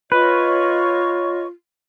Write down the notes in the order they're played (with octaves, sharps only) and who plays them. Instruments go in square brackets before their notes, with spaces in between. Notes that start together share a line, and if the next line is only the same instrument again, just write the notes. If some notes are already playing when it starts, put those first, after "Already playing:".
[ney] F4 [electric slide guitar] B4 [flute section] C#5 D#5 C#6